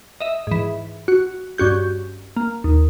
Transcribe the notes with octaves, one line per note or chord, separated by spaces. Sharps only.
D#5 E5
G#2 E3
F#4
G2 C#4 F#4 G6
A#3
D#2